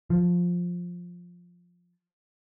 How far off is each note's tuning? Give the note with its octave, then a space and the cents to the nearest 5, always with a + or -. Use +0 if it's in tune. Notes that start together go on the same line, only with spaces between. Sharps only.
F3 +10